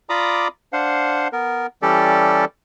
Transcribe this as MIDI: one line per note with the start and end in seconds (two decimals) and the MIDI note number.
0.10 0.48 65
0.10 0.48 74
0.10 0.48 82
0.10 0.48 83
0.10 0.48 86
0.10 0.48 87
0.73 1.28 62
0.73 1.28 72
0.73 1.28 77
0.73 1.28 78
1.32 1.67 59
1.32 1.67 70
1.82 2.45 52
1.82 2.45 55
1.82 2.45 61
1.82 2.45 67
1.82 2.45 69
1.82 2.45 74